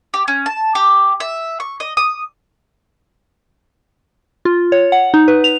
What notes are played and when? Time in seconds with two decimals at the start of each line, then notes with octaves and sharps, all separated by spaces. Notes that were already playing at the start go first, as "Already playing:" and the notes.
0.14 G4
0.28 C#4
0.46 A5
0.75 G4
1.20 E5
1.60 C#6
1.80 D#5
1.97 D#6
4.45 F4
4.72 C#5
4.92 F#5
5.14 D#4
5.28 B4
5.44 F7